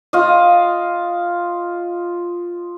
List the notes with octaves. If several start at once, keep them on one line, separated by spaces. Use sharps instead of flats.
F4 D#5